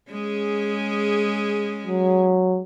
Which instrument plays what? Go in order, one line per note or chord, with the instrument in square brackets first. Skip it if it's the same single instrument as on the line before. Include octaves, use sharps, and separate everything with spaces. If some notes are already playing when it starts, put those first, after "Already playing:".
[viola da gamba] G#3 C#4 G#4
[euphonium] F#3